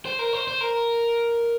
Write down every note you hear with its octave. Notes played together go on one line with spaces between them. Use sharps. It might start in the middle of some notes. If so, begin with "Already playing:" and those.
C5
A#4
C5
C5
A#4